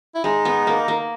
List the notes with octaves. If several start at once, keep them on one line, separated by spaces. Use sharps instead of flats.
E4
G#3 D#4
B3
A#3
A#3